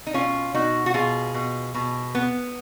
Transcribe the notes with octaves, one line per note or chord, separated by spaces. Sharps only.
D#4
B2 C#4 F4
B2 D#4 F#4
F#4
B2 F4 G#4
B2
B2
B3